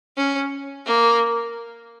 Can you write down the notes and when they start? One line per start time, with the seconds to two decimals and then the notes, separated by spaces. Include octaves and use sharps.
0.17 C#4
0.86 A#3